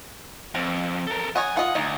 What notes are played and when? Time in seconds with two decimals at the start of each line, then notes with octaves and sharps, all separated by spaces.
0.55 F2 C4
1.07 A4 A#4
1.36 C#5 D#5 F#5 G#5
1.57 F4 D#5 F5 F#5
1.75 D2 D#4 D#5